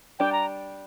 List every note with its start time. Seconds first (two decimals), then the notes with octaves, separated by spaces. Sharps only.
0.19 G3 D4 G4 G5
0.32 A#5